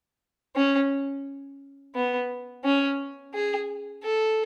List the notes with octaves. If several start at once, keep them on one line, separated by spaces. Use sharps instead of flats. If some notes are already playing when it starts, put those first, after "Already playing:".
C#4
B3
C#4
G#4
A4